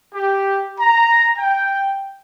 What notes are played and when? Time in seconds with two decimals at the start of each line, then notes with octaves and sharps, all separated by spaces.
0.15 G4
0.80 A#5
1.37 G5